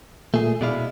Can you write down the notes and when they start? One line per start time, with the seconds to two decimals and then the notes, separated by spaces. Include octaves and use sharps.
0.34 A#2 A3 G#4
0.61 B2 G#3 E4 D5 F5